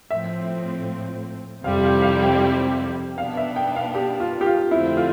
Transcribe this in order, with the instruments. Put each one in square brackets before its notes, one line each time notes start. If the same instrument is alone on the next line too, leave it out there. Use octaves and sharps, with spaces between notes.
[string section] A2 F3 C4 [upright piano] E5
[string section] F2 C3 G3 C4 E4 [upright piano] F5
[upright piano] F5
F5
G5
[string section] B2 B3 D4 [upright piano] F5
[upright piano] E5
G5
F5
G4
F4
G4
F4
[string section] F2 D3 A3 C4 [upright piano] E4
[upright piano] F4